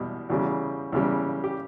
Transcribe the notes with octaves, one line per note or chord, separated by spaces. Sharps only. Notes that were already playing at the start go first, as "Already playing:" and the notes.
Already playing: E2 B2 G3
E2 C#3 G3 F#4
E2 C#3 G3
G4